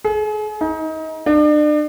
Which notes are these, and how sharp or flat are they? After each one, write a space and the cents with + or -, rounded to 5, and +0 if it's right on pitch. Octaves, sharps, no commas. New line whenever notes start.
G#4 +35
D#4 +30
D4 +35